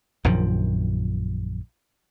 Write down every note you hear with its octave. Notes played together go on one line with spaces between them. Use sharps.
A#1 F#2 D#3 F3